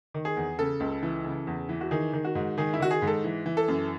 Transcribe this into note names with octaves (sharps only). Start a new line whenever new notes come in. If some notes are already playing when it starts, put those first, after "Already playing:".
D#3
G#4
E2
C#3 A4
C#2
E3
C#3
E2
E3
F#4
D#3 G#4
D#3
F#4
G#2
D#3 G#4
E4
D#3 F#4
G#4
G#2
A4
E3
E3
A4
F#2